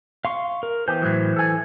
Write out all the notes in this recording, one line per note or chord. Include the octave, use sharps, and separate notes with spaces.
F5 C6 C#6
A#4
E3 B3 G4 C5 G6
A2 F#3
A4 G#5